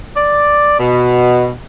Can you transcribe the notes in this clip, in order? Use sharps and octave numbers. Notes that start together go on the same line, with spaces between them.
D5
B2